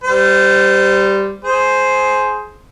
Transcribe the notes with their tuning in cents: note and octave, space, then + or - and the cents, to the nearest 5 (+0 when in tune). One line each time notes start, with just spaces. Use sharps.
G3 +0 C5 -25
G#4 +15 C5 +0